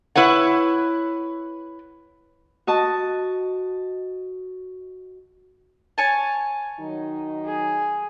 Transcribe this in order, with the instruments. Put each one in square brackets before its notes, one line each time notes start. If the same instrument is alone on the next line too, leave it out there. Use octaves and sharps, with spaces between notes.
[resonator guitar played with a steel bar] E4 B4 C#5 F#5
[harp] F#4 D#5 A5
[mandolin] C#5 G#5 A5
[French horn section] D#3 F#3 D#4
[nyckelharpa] G#4